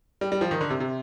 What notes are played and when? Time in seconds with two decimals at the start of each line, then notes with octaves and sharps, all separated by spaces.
0.21 G3
0.32 G3
0.41 F3
0.51 D#3
0.61 D3
0.70 C3
0.80 C3